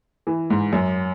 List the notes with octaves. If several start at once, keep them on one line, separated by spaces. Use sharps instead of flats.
E3
G#2
F#2